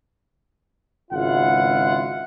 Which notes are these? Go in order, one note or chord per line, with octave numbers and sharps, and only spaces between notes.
G#1 C#2 E4 F4 F#5